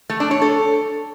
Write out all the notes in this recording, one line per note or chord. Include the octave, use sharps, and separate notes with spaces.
A3
D4
C#5
A4